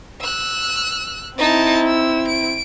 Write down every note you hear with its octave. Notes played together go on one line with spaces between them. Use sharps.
E6 F#6
C4 D#4 E4 A5
E6
D7